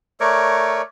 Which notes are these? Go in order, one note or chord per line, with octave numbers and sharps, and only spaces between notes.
A3 A#4 C#5 D5